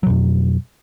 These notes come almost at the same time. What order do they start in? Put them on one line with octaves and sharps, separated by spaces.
F#3 B2 F2